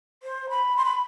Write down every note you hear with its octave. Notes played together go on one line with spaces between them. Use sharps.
C5
B5
C6
B5